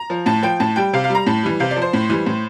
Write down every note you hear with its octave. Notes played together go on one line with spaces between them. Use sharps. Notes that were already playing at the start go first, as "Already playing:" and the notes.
Already playing: A#5
F3
A2 A5
F3 G5
A2 A5
G3 G5
C3 F5
F5
G3 A#5
A2 A5
E3 G3
C3 F5
D5
F3
C5
A2
E3 G3
A2